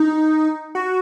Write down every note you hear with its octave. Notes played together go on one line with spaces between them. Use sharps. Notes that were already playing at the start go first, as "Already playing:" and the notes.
Already playing: D#4
F#4